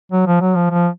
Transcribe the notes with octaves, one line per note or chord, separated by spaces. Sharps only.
F#3
F3
F#3
F3
F3